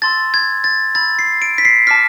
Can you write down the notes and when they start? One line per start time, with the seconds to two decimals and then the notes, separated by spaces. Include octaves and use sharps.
0.02 A5 C6 E6 A6
0.34 G#6
0.64 A6
0.95 B5 E6 A6
1.19 C7
1.42 D7
1.58 B6
1.65 C7
1.87 A5 D6 F6 B6